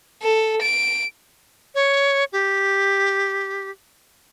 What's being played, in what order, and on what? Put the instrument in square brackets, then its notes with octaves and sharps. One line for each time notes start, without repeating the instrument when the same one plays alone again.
[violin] A4
D7
[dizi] C#5
G4